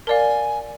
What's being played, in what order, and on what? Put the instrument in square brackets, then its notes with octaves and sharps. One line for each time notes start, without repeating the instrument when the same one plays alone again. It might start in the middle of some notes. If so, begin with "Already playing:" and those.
[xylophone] A#4 D5 F5 [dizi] G#5 A5